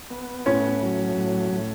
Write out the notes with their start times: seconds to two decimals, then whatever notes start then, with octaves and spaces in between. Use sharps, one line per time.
0.11 B3
0.46 A2 C#4
0.82 F#3
1.17 A2
1.52 A2